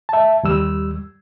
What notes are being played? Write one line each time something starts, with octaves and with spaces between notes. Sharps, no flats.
E5 A5
D#2 G3 E6